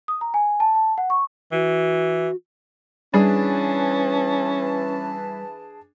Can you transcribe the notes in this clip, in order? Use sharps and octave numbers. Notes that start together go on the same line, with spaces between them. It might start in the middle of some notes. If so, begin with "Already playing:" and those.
D#6
A#5
G#5
A5
A5
F#5
C#6
E3 F#4
E3 G3 C#4 D4 G#4 B4 A5